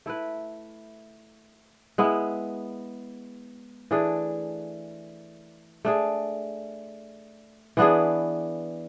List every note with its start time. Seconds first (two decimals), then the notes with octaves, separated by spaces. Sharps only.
0.06 A3 E4 B4
1.98 G#3 B3 E4
3.91 E3 A3 D4 G#4
5.85 A3 D4 G#4
7.77 E3 B3 D4 G#4